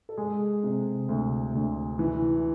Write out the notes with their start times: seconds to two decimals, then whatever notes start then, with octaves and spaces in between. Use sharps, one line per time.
0.09 A4
0.17 G#3 G#4
0.64 C3
1.09 D2
1.54 D2
1.99 E3